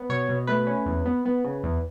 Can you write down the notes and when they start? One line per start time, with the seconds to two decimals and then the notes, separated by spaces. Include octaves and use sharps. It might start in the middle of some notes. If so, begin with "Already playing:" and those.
Already playing: B3
0.09 B2 C#5
0.29 B2
0.47 A3 B4
0.67 C#4
0.86 E2
1.06 B3
1.26 B3
1.44 C#3
1.63 E2